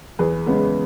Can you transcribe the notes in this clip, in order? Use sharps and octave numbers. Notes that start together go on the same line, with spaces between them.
E2 G#4 B4
C#3 G#3 B3